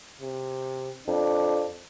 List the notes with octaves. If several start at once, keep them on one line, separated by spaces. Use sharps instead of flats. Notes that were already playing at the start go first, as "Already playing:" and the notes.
C3
F2 D4